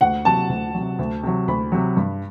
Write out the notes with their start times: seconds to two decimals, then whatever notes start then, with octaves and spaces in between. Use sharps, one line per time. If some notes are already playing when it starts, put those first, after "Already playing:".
0.01 D2 F#5
0.25 C3 F#3 A5
0.49 D2
0.74 C3 F#3
0.99 D2
1.23 C3 F#3
1.48 D2 B5
1.72 C3 F#3
1.97 G2